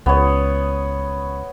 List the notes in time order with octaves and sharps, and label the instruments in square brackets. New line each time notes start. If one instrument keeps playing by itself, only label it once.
[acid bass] C#2 [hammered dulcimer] B3 C#5